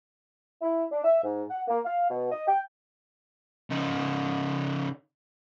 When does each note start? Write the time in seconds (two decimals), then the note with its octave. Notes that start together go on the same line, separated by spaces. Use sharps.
0.61 E4
0.91 D4
1.04 E5
1.24 G#2
1.50 F#5
1.68 A#3
1.85 F5
2.10 B2
2.32 D#5
2.48 G5
3.70 C#3 D#4